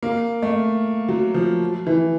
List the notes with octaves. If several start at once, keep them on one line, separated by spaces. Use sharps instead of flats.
A#3
A3
F#3
F3
E3